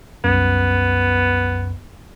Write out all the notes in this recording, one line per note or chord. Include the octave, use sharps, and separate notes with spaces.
C2 F#2 B3